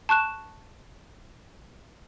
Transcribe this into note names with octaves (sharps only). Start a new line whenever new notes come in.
A5 C#6 F#6 E7